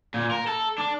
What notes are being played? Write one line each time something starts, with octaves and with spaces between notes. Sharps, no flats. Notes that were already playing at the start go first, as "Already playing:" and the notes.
A#2
A#4
A4
D4